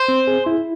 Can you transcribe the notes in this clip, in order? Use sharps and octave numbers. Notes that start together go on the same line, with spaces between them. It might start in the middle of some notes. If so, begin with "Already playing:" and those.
Already playing: C5
C4
G#4
E4